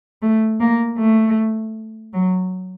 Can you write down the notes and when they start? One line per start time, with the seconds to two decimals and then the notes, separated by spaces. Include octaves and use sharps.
0.22 A3
0.60 A#3
0.98 A3
2.13 F#3